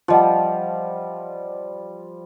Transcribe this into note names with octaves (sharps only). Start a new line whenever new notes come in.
F3 G3 F4 D#5 F#5